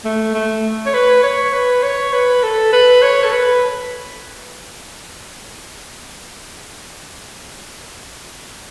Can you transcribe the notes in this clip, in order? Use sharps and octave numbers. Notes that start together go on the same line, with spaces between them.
A3
A3
C#5
B4
C#5
B4
C#5
B4
A4
B4
C#5
A4
B4